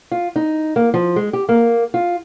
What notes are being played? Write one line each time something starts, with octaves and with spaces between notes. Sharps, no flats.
F4
D#4
A#3
F3
G#3
G4
A#3
F4